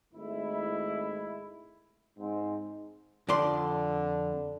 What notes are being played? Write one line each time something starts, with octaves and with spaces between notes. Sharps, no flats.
G#1 G#3 A3 E4
G#2 C4
F2 D3 D5 C6